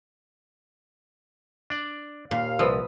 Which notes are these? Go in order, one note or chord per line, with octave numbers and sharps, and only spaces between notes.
D4 D5
D#2 A#2 F5
C2 F3 B4 D#6 E6